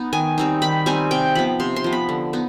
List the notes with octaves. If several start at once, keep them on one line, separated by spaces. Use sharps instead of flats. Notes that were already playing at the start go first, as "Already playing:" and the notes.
Already playing: B3 D#4
D#3 G#5
G3 C4 D#4
D#3 B5
G3 C4 D#4 G#5
C3 G5
F3 B3 B5
C3 C6
C6
F3 B3
B5
D3
B3 D#4